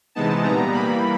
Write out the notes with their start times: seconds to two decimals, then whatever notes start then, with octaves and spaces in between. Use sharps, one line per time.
0.15 C3 E3 G#3 B3 D#4 A5
0.44 A#2 G3 B3 A#5
0.72 E3 G3 A#3 B5